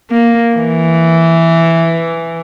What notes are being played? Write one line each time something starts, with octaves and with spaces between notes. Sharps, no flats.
A#3
E3